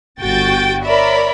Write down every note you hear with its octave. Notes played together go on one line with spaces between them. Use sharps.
G1 F#4 G5 A6
A#4 C#5 D5 E5 B5